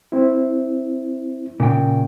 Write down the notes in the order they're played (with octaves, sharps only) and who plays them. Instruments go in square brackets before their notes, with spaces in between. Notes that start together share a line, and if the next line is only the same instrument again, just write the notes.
[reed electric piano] C4 E4
[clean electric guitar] A#2 C#3 G5